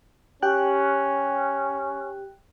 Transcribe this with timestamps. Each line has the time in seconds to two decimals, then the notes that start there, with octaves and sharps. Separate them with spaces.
0.42 C#4 G4 G5 F#6